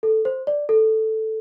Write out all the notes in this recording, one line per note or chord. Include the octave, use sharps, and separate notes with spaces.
A4
C5
D5
A4